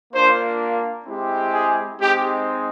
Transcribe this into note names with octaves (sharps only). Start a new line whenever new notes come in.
A#3 D4 F4 C5
G#3 C4 E4 G4
G#4
G#3 C4 D#4 G4